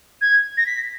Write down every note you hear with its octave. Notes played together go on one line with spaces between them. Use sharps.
G#6
A#6
B6